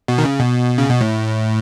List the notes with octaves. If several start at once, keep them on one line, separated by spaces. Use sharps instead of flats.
B2
D#3
C#3
B2
C#3
B2
A2